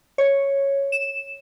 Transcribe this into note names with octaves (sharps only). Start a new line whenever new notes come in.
C#5
E7